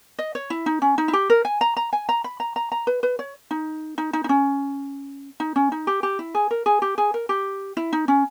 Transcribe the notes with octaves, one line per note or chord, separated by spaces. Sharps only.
D#5
C#5
E4
D#4
C#4
D#4
E4
G4
A#4
G#5
A#5
A#5
G#5
A#5
B5
A#5
A#5
A#5
B4
B4
C#5
D#4
D#4
D#4
D#4
C#4
D#4
C#4
D#4
G4
G4
E4
G#4
A#4
G#4
G4
G#4
A#4
G4
E4
D#4
C#4